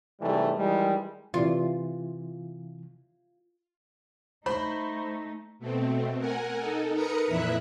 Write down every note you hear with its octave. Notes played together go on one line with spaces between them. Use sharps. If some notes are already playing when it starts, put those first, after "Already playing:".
G#2 C3 E3 G3 A3
D#3 E3 G3 G#3
C3 E3 F4
A3 D#4 C5 B5
B2 A3 C4
A#4 F#5 G#5
D#4 A4
A#4 B4 A#5 D#6 C#7
F2 A#2 E3 E4 E5 F#6